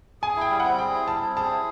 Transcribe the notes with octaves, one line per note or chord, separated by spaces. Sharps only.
G#4 G#5
E4
G5
G3
F#5
C4
G#4 G5
E4
G3 A5
C4
G#4 A5
E4